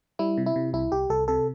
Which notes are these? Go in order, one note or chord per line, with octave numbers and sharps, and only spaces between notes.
G3 E4
C3
E4
C3
C2 E4
C2 G4
C2 A4
C3 A4